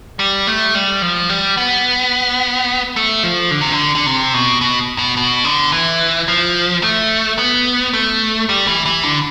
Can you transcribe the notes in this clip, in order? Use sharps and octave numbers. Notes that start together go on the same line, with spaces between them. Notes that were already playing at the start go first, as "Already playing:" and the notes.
G3
A3
G3
F3
G3
B3
A3
F3
D3
C3
D3
D3
C3
B2
B2
B2
B2
D3
E3
F3
A3
B3
A3
G3
E3
E3
D3